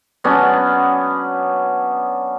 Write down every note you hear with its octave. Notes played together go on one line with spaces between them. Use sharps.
F#3 B3 C#4 D4